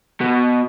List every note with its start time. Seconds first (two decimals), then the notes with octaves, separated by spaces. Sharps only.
0.21 B2